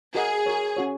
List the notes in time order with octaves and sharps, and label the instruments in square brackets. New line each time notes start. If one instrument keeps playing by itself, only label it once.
[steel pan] F#4 A#4 D#5 F#5 [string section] G#4
[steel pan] F#4 A#4 C#5
C#4 F#4 C#5